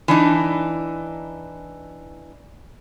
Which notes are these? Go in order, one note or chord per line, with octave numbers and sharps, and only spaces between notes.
E3 D4 D#4